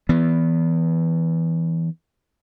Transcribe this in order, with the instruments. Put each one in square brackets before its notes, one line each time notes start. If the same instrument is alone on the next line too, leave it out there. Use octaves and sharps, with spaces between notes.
[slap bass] E3 B3